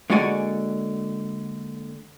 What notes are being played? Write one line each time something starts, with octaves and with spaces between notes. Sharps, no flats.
D3 G#3 A#3 F#4 D5 G#5